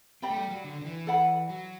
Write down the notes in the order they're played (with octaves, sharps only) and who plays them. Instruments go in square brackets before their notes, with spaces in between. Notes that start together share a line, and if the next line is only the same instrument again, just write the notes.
[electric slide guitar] C4 [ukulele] G4 D5 G5 B5
[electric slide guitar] A3
G3
F#3
D3
D3
E3
[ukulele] A4 D5 F#5 B5
[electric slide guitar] F#3